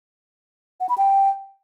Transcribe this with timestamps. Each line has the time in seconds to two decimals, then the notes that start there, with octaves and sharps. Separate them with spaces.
0.80 F#5
0.89 B5
0.98 G5